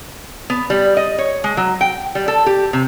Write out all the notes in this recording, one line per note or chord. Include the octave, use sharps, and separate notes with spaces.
B3
G3
D#5
C#5
G#3
F#3
G5
G3
A4
G4
C3